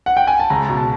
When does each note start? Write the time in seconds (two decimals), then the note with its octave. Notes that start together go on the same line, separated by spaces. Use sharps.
0.06 F#5
0.17 G5
0.27 G#5
0.40 A5
0.50 C#2 A#5
0.69 B2
0.77 A5